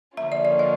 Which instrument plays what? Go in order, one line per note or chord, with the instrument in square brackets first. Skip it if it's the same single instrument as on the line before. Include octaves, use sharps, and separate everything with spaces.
[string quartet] D3 F3 A#3 C#4 F4 [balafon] E5
[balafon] D5
D5
D#5